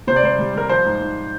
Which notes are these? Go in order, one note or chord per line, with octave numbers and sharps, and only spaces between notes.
C3 C5
D5
G3 C5
G3
G3 A#4
F3 C5
G#2
G#2